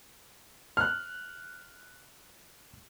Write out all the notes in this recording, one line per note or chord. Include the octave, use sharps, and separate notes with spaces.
F6 F#6